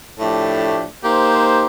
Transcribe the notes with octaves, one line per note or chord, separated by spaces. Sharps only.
A2 F3 A3 D4 G4
A#3 D#4 G4 C5